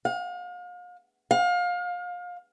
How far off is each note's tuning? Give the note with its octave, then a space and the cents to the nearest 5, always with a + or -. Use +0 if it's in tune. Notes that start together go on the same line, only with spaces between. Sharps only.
F5 +40
F5 +30